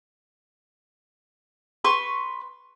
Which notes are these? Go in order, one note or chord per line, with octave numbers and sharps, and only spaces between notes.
B4 C6 C#6